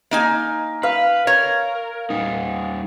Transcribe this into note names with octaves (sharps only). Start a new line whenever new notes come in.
A#3 D#4 G#5
B4 F5
A#4 C#5
G3 D#4